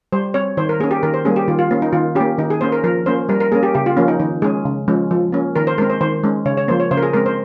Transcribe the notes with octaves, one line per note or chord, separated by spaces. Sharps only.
G3 C5
C4 C#5
D#3 C5
A#4
A#3 C#4 G#4
G4
D#3 A#4
C5
G3 A#3 C#4 G#4
G4
D#3 F4
F4
A#3 C#4
D#4
D#3 F4
A#3 C#4 G4
D#3 D#4
G#4
A#3 C#4 C5
A#4
F3 A#4
A#3 C#4 C5
G3 A#4
A#4
A#3 C#4 G#4
G4
C#3 G4
F4
F3 A#3 C#4
D#4
D#3 D#4
G#3 C#4 G#4
C#3
F3 G#3 C#4
F3
A#3 C#4
D#3 A#4
C5
G#3 C4 A#4
C5
D#3 C5
G#3 C#4
C#3 C#5
C#5
F3 A#3 C5
C#5
C#3 C5
A#4
G#4
G#3 C4 A#4
C5